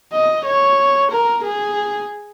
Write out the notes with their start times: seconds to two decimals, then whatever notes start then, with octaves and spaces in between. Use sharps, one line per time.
0.12 D#5
0.45 C#5
1.11 A#4
1.44 G#4